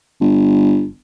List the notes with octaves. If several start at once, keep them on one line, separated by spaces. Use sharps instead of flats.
G1